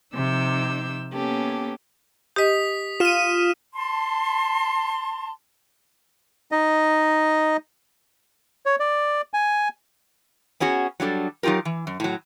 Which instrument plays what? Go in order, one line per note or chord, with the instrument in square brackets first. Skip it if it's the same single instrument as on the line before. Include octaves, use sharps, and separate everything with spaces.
[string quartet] C3 F3 D#4 D6 E6 G6
A#3 B3 C#4 G4 A4
[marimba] G4 D#5 [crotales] D#6 B6
[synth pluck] F4 D#7 [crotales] F6 E7
[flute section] A5 C6
[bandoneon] D#4 D#5
[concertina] C#5
D5
G#5
[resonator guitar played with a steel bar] B3 C#4 F#4 G#4
F#3 G3 D4 A4
F#3 D#4 F4 G4 A#4
E3
F#2
A2 F#3